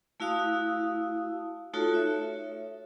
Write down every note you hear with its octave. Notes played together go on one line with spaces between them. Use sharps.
A3 E4 F#4 F5 D#6 E6
A3 D#4 F4 F#4 A4 C#5
C#5 E5